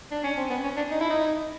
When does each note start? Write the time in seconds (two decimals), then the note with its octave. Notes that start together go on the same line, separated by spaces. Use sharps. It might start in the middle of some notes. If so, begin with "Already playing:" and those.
0.11 D4
0.24 C#4
0.37 C4
0.50 B3
0.64 C#4
0.77 D4
0.91 D#4
1.00 E4
1.10 D#4